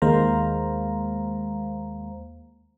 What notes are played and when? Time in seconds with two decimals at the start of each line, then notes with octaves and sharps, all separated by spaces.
0.02 D#2 G#3 A#3 C5 F5 A#5